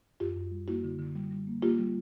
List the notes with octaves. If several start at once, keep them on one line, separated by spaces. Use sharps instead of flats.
F#2 F4 G4
F#2
G3
A#3 E4 F#4
D3
D3
G3
G3
A#3
A#3 F4 G4
G3